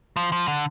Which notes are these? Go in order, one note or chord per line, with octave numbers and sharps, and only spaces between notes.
F3
F3
D3